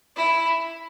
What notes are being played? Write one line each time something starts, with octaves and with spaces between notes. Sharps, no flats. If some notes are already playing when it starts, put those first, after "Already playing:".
E4